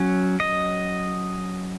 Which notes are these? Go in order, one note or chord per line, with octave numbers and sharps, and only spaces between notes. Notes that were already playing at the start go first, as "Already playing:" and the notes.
Already playing: F#3 C#4
D#5